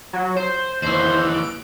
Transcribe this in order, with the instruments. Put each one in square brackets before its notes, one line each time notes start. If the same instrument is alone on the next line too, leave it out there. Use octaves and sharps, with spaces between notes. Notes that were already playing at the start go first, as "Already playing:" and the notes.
[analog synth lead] F#3
C5
[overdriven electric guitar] D#2 E3 [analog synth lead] C5
[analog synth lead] D7